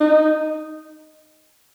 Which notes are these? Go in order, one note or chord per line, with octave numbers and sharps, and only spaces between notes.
D#4